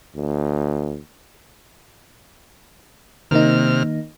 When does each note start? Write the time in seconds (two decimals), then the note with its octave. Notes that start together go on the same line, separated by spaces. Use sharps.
0.16 D2
3.31 C3 D#3 A#3 D#4 F6